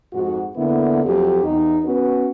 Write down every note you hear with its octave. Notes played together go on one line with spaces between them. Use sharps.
F2 G#2 F#4
D3 A#3 B3 E4
F2 F#3 G4
E2 D#4
B3 C#4 F#4 B4